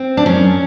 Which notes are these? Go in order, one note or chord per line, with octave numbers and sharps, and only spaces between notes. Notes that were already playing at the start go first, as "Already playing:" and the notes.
Already playing: C4
D4
F#2 C#4